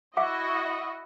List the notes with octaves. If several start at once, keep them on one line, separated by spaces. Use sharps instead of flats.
E4 F#4 D#5 E5 F#5 D6